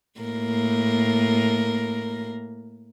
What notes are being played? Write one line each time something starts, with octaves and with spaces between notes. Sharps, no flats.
A2 A#3 A#4